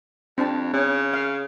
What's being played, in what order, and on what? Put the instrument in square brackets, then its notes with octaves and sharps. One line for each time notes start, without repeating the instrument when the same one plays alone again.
[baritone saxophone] F2 [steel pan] C4 D4 A5
[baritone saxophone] C#3 [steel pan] C#4
[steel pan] F5